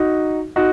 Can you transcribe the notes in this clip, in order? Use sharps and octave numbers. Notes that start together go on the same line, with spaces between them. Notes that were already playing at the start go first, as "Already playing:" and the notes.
Already playing: D#4 F#4
D#4 F#4